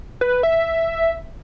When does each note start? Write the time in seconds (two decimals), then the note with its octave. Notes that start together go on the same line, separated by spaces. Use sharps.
0.21 B4
0.43 E5